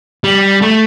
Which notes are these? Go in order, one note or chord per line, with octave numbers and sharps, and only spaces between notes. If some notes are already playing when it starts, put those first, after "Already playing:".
G3
A3